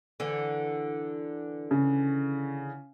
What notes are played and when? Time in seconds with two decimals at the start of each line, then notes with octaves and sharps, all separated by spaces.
0.20 D3 E3
1.71 C#3